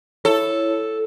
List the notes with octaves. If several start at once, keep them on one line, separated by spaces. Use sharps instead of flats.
E4 A4 C#5